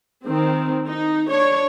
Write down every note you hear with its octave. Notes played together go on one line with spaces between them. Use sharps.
D#3 C4
D#4
D4 C#5